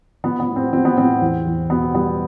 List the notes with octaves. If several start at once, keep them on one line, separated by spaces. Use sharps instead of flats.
F3 B3
B3
A2
C4
F3 C4
B3
A2 C4
E2
E2
B2 B3
G3 B3